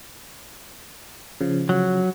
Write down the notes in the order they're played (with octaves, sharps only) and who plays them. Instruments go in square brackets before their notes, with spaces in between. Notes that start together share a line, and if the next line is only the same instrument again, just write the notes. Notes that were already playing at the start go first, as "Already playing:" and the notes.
[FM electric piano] C#3 F3
[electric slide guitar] F#3